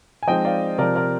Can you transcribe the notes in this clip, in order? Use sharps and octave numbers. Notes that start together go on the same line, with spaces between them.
G#5
F3 G#3 C4 D#4 D#5 G5
D5 F5
C3 F3 C4 A#4 D5
A#4 D5